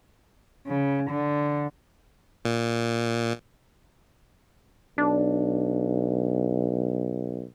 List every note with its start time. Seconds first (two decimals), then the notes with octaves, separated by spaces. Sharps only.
0.67 C#3
1.10 D3
2.45 A#2
4.98 B1 D4